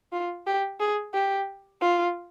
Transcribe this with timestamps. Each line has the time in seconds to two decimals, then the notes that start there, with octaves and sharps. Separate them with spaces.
0.13 F4
0.47 G4
0.80 G#4
1.14 G4
1.82 F4